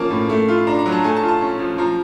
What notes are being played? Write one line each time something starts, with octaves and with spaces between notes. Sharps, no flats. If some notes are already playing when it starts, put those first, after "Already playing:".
Already playing: F3 A#3 C#4 A5
A2
A3
F4
D4 A#5
A#5
F#3
A5
A3 G#5
A5
F4
A5
C#4
F3
F3 A#5